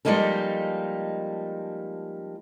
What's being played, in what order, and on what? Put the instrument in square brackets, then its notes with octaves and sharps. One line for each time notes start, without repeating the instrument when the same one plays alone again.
[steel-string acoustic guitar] F3 G3 G#3 A#3 D#4 A4